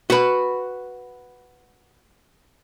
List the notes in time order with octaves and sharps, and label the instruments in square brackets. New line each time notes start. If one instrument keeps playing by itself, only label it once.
[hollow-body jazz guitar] F#4 B4